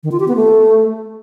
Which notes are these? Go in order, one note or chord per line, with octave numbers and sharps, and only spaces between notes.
D#3
F4
G4
B3
A3